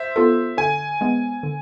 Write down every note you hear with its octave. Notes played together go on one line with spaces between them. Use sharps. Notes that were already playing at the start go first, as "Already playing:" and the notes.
Already playing: C5 E5
B3 F4 A4
D3 G#5
G#3 B3
D3